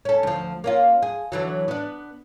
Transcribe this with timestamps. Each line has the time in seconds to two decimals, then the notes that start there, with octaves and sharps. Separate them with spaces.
0.05 C#4 A4
0.23 D2 F3
0.64 A#3 C#4 F4
1.02 G#4
1.32 D3 E3 F#3
1.68 B3 D4